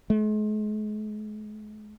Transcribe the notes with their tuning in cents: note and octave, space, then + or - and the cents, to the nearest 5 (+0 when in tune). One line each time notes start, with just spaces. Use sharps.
G#3 +40